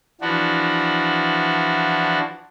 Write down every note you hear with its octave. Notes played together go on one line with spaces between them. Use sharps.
E3 F3 D4 F#4